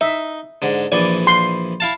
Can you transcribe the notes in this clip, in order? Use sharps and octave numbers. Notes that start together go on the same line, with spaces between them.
D#4 E5
G#2 D3
A#1 E3 D5 G#5
C6
E4 F5 A5